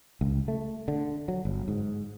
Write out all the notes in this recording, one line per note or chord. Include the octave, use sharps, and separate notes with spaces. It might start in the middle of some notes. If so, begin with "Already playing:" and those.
C#2
A3
D3
F#3
G1
G#2